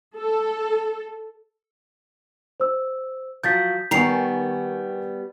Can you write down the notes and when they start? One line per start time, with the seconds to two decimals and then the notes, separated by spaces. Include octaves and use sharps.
0.17 A4
2.60 C5 E6
3.43 F3 F#3 G6 A6 B6
3.91 D#3 G3 B3 G#5 A#5 C#6 C7 F7